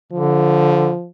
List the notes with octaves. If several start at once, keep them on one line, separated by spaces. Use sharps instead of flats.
D3 F3